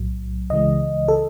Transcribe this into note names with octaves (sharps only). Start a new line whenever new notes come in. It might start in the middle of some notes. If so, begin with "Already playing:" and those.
Already playing: B1 A2 F#3
C#2 C#3 E3 G#3 D#5
A4